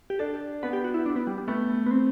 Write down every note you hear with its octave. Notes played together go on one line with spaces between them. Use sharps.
G4
D4 A4
B3 B4
G4
F#4
E4
D4
B3
G3
G3
A3 B3
B3
C4